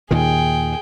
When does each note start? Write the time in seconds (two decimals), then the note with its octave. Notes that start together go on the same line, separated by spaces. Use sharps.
0.11 D#2 A#2 D#3 G#4 G5